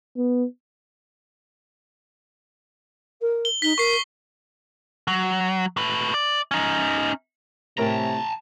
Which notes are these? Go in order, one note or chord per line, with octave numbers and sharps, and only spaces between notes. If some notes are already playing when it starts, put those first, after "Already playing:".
B3
A#4
G7
D#4 B6 G7
A#4 C#6 C7
F#3
A3 B4
D5
C#4 D#4
A2 C3 E4 A#4 C#5 G5 A5 A#5